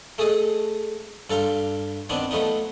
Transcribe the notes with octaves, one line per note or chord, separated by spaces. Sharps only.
A3 G#4 A4 D#5
G2 A4 F5 A#5 C6
D#3 B3 C4 D4
F3 A3 B3 D#4